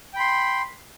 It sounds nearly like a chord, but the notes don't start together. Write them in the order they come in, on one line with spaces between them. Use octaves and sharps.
G5 B5 C6